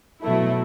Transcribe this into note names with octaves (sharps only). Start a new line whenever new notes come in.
B2 F#3 A3 E4